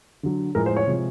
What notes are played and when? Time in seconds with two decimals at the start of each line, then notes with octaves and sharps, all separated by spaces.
0.23 D3 F#3
0.55 A2 F3 G#3 A#4
0.66 C5
0.76 C#5
0.87 C3 F3 G#3